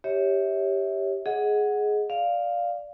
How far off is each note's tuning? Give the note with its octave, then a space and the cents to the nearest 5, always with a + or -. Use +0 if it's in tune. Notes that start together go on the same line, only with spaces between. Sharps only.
G4 +0 C#5 +0 E5 -25
G#4 +10 D#5 +20 F#5 -5
D5 +0 F5 +0